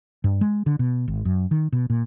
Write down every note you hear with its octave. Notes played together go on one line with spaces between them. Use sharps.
G2
G#3
D3
B2
G#1
F#2
D#3
B2
A#2